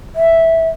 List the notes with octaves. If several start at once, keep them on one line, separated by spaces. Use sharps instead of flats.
E5